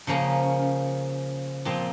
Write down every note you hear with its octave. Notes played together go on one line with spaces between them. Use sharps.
C#3 F3 A#3 C#4
A#2 F3 C4